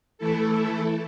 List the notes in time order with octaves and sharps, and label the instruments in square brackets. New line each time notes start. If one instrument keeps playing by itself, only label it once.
[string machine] E3 A3 E4 A4